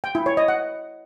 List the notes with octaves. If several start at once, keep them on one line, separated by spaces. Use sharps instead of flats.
G5
E4
C#5
D#5
F#5